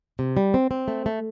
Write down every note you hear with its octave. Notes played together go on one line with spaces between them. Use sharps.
C3
G3
C4
C4
A3
A3